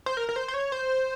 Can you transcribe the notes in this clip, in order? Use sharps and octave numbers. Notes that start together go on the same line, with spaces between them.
C5
A#4
A#4
C5
C5
C#5
C5